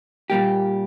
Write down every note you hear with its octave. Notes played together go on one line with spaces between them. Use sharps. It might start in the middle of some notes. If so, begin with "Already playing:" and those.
A#2 G3 A#3 G4